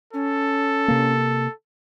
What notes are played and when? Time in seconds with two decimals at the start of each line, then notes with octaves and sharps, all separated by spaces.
0.14 C#4 A4
0.88 C3 A#3